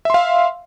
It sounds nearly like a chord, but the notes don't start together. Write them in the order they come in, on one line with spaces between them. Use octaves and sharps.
E5 C6 F5